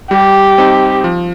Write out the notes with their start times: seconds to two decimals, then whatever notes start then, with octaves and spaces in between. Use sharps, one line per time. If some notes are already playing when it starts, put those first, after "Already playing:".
0.11 G3 G4
0.58 C4 D#4
1.04 F3